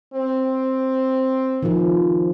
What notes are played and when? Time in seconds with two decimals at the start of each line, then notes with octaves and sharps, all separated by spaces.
0.13 C4
1.63 D#3 F3